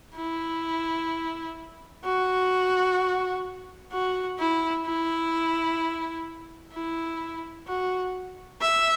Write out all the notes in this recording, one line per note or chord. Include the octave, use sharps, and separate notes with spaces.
E4
F#4
F#4
E4
E4
E4
F#4
E5